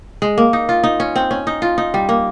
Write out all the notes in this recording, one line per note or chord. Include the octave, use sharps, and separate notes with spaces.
G#3
A#3
D#4
F4
D#4
C#4
C4
C#4
D#4
F4
D#4
G3
A#3